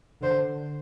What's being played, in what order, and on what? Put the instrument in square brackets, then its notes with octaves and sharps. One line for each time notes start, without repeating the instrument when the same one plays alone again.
[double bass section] D3 [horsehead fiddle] C5